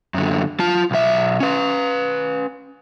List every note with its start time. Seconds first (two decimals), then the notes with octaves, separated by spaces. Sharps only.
0.14 F#2 D3
0.60 F4 A5
0.91 B1 E5
1.40 C#4 B4